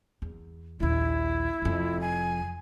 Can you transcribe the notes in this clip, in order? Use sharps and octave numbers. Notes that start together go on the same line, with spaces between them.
E2
A#1 D#2 E4
F1 F2
G#5